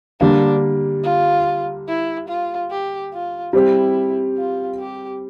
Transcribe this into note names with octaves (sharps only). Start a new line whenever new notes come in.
D3 G3 A#3 D4
F4
E4
F4
G4
F4
G3 C4 E4 G4
F4
G4